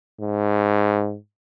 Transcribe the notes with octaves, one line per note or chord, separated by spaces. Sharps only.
G#2